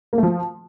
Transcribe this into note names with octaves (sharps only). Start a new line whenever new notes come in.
A#3
A3
F3